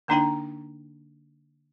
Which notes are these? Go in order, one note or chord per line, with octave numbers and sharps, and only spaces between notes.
D3 A#3 D4 D#4 G5 A#5